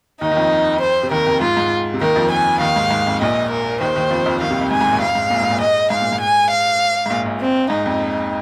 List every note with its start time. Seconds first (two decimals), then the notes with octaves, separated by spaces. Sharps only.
0.21 D#2 D#3 D#4
0.32 D#3
0.36 F2 F3
0.81 C5
1.03 C3
1.11 D#2 D#3 A#4
1.26 F2
1.41 G#2 F4
1.57 G#2
1.94 C3
2.01 D#2 D#3 A#4
2.16 F2 F3
2.31 G#5
2.61 D#2 D#3 F5
2.76 G#2
2.91 G#2
3.07 F2
3.21 A#1 A#2 D#5
3.51 A#4
3.81 D#2 D#3 C5
3.96 D#2 D#3
4.11 F2 F3
4.26 F2 F3
4.41 D#2 D#3 F5
4.50 C2 C3
4.61 F2
4.70 G#2 G#5
4.81 G#2
4.91 A#1 A#2
5.01 F2 F5
5.15 G#2
5.30 A#1 A#2
5.40 G#2
5.50 A#1 A#2
5.61 G#2 D#5
5.90 G#2 F5
6.02 A#2
6.13 G#2
6.21 G#5
6.51 F5
7.06 G#2
7.10 A#1 A#2
7.26 A#1 A#2
7.41 C4
7.70 G#2 D#4
7.86 F2